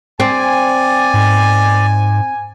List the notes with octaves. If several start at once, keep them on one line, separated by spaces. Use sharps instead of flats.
C4 D5 G#5
G#2